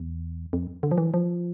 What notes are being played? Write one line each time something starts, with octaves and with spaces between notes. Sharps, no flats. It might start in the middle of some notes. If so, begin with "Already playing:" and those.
Already playing: E2
F2
D3
F3
E3
F3